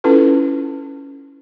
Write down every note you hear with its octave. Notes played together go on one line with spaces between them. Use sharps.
C#4 E4 F4 A4 B4